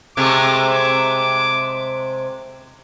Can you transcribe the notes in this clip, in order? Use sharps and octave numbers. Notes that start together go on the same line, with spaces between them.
C3 G#3 A3 D6